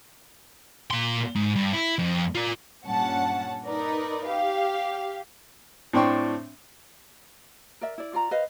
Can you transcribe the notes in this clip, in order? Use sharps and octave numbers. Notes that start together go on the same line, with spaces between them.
A#2 C6
G#2
G2
E4
F2
F4 D5
G2 A#2 C#4 F#5 A5
D#4 A#4 B4 D5
G4 F5
A2 C4 D4 G5 C6 C#6
A#4 D5 E5
E4 D5
F4 D5 A#5
B4 C5 D#5 F5